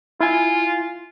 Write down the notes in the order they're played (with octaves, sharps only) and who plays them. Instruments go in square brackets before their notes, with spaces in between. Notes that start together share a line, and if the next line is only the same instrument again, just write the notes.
[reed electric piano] E4 G#5 [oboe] F4